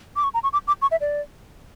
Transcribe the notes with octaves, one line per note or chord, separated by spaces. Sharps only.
D6
C#6
A#5
C#6
D6
D6
C#6
E5
D5